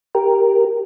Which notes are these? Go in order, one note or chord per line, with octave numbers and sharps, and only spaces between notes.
G4 A#4